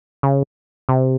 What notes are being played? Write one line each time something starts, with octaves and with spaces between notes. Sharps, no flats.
C#3
C3